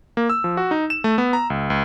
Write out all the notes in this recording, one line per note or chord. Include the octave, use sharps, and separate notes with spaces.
A#3
E6
F3
F#4
D#4
E7
A3
B3
A#5
C#2
C#2